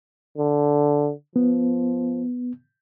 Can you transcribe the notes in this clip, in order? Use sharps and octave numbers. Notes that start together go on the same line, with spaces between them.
D3
F3 B3